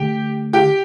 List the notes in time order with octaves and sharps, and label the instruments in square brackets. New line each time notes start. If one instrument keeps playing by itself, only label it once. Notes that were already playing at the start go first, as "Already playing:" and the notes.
Already playing: [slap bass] D3 A3 D4 [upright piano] G4 G5
[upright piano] G4 G5